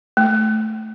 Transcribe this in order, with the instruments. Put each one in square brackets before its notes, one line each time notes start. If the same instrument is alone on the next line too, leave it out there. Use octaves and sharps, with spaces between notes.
[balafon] A3